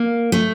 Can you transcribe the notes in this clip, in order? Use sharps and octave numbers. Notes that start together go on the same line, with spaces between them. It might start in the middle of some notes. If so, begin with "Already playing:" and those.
Already playing: A#3
A3